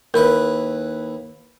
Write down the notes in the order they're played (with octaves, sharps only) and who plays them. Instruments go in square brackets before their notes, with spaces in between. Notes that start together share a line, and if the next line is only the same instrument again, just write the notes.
[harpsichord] D#2 E4 B4 [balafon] A#4